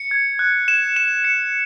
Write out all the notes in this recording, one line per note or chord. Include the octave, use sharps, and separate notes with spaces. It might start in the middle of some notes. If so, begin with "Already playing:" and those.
Already playing: C#7
G#6
F#6
E7
E7
C#7